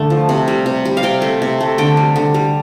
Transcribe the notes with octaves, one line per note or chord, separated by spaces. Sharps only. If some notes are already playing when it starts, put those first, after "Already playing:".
Already playing: D3 A3
F3
C3
G3
C3
G3
F5
C3 G5
A3
C3
A3
D3 G5
G3
D3
G3